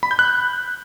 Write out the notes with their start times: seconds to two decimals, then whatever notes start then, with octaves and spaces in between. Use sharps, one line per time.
0.03 B5
0.11 G6
0.19 F#6